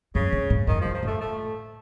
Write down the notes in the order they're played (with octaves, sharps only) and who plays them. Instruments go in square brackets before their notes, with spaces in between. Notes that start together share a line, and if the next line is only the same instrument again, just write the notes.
[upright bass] F#2 [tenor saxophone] C#3
[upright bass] C3
A2
[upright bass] F#2 [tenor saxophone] D#3
[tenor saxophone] F3
[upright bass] F2
[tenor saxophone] F3
[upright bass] A2 [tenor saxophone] A3
[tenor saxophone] A3